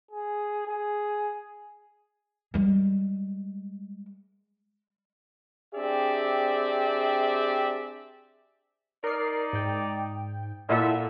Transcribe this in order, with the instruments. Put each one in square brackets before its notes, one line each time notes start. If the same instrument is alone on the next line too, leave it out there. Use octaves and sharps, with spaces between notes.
[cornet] G#4
G#4
[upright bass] G3 G#3
[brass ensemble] C4 D4 G4 G#4 D5 E5
[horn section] D#4 D5 [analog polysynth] A#4 C7
[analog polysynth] G#2 G5
[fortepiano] A#2 F#5 [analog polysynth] E4 F4 A4 [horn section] E5